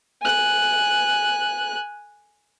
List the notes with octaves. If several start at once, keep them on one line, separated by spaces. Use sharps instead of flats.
G#5 F#6